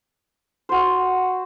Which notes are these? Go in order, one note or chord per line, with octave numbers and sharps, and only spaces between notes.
F#4 C5